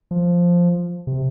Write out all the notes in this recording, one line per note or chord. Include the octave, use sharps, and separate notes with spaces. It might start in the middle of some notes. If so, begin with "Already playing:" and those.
F3
C3